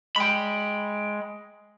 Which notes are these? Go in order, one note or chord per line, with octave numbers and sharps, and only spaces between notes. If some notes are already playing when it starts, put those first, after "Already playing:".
G#3 G5 B5